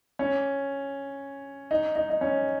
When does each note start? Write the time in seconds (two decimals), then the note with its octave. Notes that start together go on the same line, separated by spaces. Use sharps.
0.19 C#4
1.71 D#4
1.96 D#4
2.10 D#4
2.21 C#4